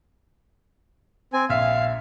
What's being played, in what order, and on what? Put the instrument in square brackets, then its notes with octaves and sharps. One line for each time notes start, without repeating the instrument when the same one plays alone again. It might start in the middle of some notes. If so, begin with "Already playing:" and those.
[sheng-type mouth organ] C4 G#5
[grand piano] A#1 E5 [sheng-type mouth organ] F5